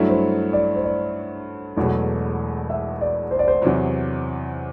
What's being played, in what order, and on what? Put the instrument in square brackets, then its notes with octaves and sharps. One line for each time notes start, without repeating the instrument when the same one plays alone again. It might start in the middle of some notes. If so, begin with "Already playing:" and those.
Already playing: [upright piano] G2 F#3 A3 E4
[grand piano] C5
D5
C5
D5
[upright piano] E1 E2 B2 F#3 A3
[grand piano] E5
D5
C5
D5
C5
[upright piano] E2 C3 F#3